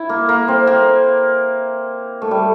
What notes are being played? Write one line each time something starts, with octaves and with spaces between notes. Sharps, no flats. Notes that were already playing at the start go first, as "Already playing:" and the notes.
Already playing: E4
A#3
A#3
C4
A#3
A3
G3